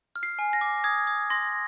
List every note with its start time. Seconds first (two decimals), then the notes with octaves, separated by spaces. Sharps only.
0.16 F6
0.23 C7
0.39 G#5
0.53 A#6
0.61 D6
0.84 D#6 G#6
1.07 D#6
1.30 C6 A#6